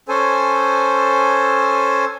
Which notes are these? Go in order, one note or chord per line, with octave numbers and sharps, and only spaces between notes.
C#4 A4 C5 G#5